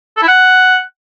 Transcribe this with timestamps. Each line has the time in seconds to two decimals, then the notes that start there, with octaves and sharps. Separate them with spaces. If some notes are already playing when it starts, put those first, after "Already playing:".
0.17 A4
0.22 E4
0.28 F#5